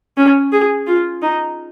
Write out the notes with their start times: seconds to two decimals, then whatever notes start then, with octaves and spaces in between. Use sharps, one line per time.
0.17 C#4
0.52 G#4
0.87 F4
1.23 D#4